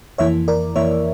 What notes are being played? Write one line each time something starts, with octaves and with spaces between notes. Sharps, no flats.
F2 E3 A#3 E4 C#5 E5
A#4 D5
F2 E3 A#3 E4 C#5 E5